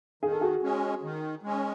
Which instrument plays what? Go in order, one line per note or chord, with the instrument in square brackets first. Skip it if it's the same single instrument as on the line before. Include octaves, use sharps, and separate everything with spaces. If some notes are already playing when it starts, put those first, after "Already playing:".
[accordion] D#3 [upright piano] G#4
[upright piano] A4
F#4 G#4
[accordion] G#3 C#4
D#3
G#3 C#4